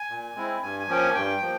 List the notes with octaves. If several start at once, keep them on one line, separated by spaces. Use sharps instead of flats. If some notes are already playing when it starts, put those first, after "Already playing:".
Already playing: G#5
A#2
G#3 C4 E4
G2 G#5
G#5
F3 A#3 C#4 G5
G#5
G2 G5
F3 A#3